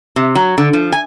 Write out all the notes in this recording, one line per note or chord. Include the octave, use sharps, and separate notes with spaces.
C3
F#3
D3
F3
G#5